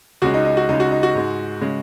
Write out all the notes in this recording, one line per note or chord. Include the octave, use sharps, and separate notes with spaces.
C#2 C#3 G#3 F#4
D#4
D#4
F#4
C#2 C#3 G#3 D#4
F#4
D#4
F#4
G#2 G#3
C#3 G#3